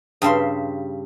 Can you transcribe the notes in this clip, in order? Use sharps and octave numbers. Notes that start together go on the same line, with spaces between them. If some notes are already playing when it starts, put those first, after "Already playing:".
G2 C#3 E5 C6